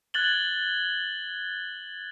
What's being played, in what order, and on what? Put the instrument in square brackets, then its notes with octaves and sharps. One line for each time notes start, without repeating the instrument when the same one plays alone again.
[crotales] F#6 G#6 A6 F#7 G7